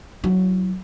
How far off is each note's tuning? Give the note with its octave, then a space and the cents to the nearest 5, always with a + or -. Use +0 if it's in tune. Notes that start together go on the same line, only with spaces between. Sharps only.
F#3 +5 E4 +0